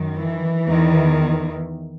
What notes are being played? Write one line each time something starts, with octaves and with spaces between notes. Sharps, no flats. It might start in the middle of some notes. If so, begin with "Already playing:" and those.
Already playing: F#2 D#3
E3
E2 D#3